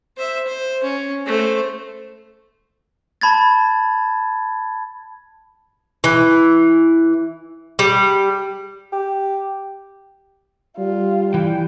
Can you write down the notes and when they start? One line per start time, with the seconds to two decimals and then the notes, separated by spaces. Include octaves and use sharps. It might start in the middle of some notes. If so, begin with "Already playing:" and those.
0.17 C5 E5
0.46 C5
0.84 C#4
1.26 A3 C5
3.21 A5 B5 G#6 A6
6.04 E3
7.79 G3
8.92 G4
10.78 G3 F4
11.34 E3 G5